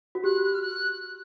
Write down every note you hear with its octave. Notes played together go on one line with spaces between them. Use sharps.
F#4
G4 F#6
F#6
F6
F#6